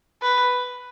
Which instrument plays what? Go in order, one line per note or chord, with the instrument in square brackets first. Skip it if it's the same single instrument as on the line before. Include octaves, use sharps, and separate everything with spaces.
[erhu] B4